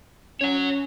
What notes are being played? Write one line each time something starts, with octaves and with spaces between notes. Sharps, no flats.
C#4 C#5 F#5